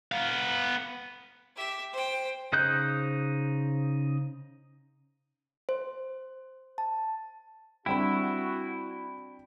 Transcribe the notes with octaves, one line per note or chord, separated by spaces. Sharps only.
B3 F5
G4 E5
C5 G5
C#3 D#4 C5 F#6 G6
C5
A5
G3 C4 D4 E4 F#4 G5 B5